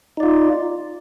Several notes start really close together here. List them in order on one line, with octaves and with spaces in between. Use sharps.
D#4 D5 F4